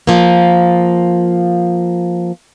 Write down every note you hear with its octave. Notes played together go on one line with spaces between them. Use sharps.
F3 A#3